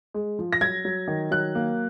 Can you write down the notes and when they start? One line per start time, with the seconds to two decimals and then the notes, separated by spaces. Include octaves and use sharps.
0.14 G#3
0.39 F3
0.53 A#6
0.61 F#3 G#6
0.85 F#3
1.08 D#3
1.31 F#3 F#6
1.55 A#3